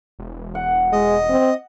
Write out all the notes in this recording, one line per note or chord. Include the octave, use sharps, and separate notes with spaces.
E1
F#5
G#3 D#5
C4